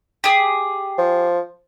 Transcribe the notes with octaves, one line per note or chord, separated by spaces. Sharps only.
G4 G#4
F3